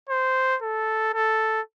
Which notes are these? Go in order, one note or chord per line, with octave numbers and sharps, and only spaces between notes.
C5
A4
A4